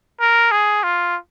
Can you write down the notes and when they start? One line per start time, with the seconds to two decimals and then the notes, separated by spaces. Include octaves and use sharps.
0.20 A#4
0.51 G#4
0.83 F4